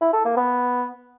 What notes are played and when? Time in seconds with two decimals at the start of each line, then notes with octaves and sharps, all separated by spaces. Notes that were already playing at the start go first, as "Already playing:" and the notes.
0.02 E4
0.13 A4
0.25 A#3
0.37 B3